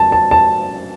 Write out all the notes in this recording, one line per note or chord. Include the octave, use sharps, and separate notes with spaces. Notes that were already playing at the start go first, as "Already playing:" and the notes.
Already playing: F#2 A5
A5
A5